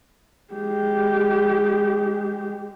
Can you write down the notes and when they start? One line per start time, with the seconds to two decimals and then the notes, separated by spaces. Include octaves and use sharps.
0.54 G#3 G4